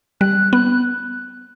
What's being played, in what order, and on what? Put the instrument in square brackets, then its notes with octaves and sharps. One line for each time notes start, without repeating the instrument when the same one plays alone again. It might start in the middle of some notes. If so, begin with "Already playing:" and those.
[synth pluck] G3 [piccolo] F#6
[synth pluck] B3 [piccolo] F#6